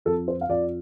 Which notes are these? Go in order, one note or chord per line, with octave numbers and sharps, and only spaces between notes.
F2 F3 A4
C5
F5
F2 F3 D5